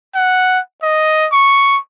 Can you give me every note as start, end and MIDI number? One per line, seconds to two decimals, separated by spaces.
0.15 0.59 78
0.83 1.28 75
1.33 1.78 85